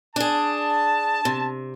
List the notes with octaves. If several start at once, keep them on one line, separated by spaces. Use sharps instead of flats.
D4 G#4 A5
C3